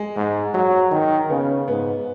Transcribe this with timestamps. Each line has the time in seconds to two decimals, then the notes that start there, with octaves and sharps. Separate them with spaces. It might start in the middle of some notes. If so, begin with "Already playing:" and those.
Already playing: G#3
0.16 G#2 G#3
0.54 F#3 G#3
0.91 D#3 D#4
1.30 C#3 B3
1.68 G#2 B3